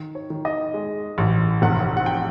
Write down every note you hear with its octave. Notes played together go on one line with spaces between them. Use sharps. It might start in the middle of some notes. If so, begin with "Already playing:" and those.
Already playing: D#3
C#5
D#3
D#5
G#3
A1
F1 F#5
F#5
G5